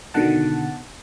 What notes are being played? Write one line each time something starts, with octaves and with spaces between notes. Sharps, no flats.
B2 D3 D#3 F#5 A5